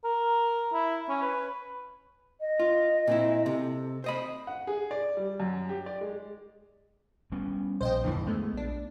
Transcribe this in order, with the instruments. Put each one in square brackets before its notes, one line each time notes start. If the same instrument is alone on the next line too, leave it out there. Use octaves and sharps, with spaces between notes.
[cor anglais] A#4
E4
C#4
B4
[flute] D#5
[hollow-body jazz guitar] F4
A#2 C4 E4
[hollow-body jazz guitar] C3 [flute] A4
[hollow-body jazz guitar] C5 D#5 B5
[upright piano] F#5
G#4
D5
G3
F#2
G4
D5
G#3
[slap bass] G3 B3 C#4
[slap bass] A#1 [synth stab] C5 D#5 G5
[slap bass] E2 G2 D4 [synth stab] A#2 D3 E3
[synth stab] G#3 A3 [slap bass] B3
[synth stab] A#1 D4